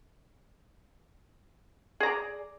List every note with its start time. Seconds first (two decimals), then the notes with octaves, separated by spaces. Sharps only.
2.00 G#4
2.03 A#5
2.06 D5